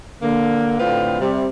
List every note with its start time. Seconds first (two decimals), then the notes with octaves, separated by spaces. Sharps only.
0.22 D3 A#3
0.79 A2 D3 C4 F4 B4 F5
1.20 C3 G3